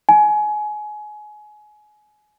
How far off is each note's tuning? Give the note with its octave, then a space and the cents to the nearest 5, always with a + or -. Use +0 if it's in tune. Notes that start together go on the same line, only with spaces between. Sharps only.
G#5 +25